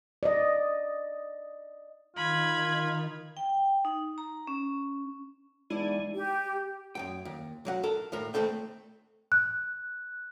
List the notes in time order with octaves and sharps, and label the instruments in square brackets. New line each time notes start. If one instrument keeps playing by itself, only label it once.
[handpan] D5 D#5
[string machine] D#3 D#4 [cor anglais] F4 [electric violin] B5 G#6
[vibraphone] G5
D#4
A#5
C#4
[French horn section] E2 D5 [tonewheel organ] G#3 [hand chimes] D#4 [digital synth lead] E4
[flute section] G4
[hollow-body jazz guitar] F#2 F#3 G5
D#2
B1 F#3 F#5
A4 A#4
D#2 A2 A#4
D#3 A3 C4 A4 G5
[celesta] F#6